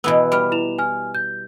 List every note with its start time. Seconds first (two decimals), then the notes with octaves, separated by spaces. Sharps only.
0.04 B2 E3 B3 B5 E6
0.32 G3 B5 F6
0.52 E4 E7 F7
0.78 G#5 F6
1.15 G6